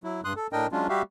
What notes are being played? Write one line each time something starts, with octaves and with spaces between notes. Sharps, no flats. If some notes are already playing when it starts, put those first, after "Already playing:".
F#3 E4
G2 C6 D#6 F#6
A4
A2 D4 A#4 D#5 G5
F#3 G#3 C#4 D4 F4
G3 F#4 G4 E5 F5